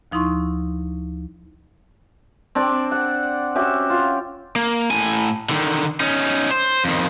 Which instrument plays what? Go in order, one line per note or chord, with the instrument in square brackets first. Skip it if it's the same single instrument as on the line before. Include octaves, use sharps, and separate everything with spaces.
[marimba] D2 F3 D#4 E4 C6 C#6
[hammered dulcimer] C4 D4 D5
F#5
C#4 F#4 G4 E5
F4
[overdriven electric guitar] A#3
A2 G#5
D3 D#3
C#4 D#4
C5
F2 D#3